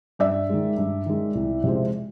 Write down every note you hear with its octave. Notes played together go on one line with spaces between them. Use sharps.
G2 D5 E5
D#3 G#3
G2
D#3 G#3
C2
C3 F3 G#3 C4